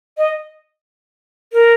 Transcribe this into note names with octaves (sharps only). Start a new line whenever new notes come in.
D#5
A#4